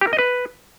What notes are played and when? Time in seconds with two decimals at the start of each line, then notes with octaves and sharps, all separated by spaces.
0.01 G4
0.07 A#4
0.13 D#5
0.19 B4